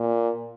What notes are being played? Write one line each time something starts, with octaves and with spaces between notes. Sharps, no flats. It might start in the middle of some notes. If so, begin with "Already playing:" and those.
Already playing: A#2